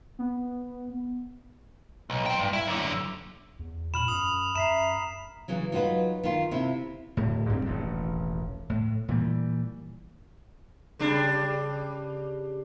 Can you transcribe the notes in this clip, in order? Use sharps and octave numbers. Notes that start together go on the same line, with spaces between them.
B3
B1
F3 G5
G2
E4
F#2 D3
E2
A#2 B5 F6 E7 F#7
F#2 D#6
F#2 E5 A#5 B6 C7 E7
C#3 E3 F#3
F#3 D#4 F4 F#4 B4
D#3 F4
C3 C4 E4
D1 A2
G2 G3 C4
E1 A1 D#2
A2
A#2 E3 G3
C#3 G3 D4